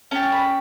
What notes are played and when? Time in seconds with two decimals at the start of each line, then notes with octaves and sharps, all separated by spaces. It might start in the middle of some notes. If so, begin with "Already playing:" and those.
0.11 C#4 G4 A5
0.32 B5